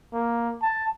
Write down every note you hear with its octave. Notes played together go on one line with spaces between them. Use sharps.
A#3
A5